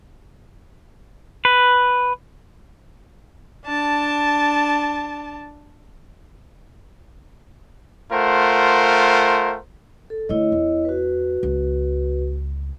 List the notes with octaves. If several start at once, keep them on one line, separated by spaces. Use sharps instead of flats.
B4
D4 A5
A3 F4 A#4 C5 F#5
A4
D3 A3 E4 C#5 D#5
E2
F#4 B4
C#2